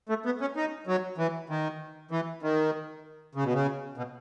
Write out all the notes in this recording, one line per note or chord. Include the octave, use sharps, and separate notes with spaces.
A3
B3
C#4
D#4
F#3
E3
D#3
E3
D#3
C#3
B2
C#3
B2